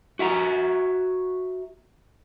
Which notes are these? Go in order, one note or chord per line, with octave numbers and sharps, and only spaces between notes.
F#4 E5 F#5 A#5